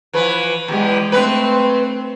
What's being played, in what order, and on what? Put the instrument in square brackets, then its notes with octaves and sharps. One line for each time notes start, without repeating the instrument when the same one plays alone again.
[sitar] E3 F3 B4
[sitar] E2 E3 [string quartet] G#3 G4
[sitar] G2 C#3 B4 [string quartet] A3 C4